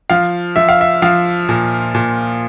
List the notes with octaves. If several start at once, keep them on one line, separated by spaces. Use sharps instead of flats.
F3 F5
F3 E5
F5
E5
F3 F5
A#2
A#2